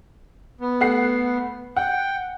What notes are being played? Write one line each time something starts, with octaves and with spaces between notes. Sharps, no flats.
B3
A3 F#5 C7
F#5 G5